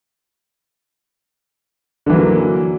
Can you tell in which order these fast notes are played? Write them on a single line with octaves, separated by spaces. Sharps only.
D3 E3 F#3 A#3